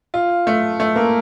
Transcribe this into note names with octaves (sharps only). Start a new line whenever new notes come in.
F4
A3
A3
A#3